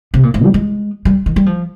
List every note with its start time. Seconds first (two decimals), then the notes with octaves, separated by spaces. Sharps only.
0.14 C3
0.23 A#2
0.34 G#2
0.44 G3
0.54 G#3
1.05 G3
1.26 D#3
1.36 G3
1.46 F3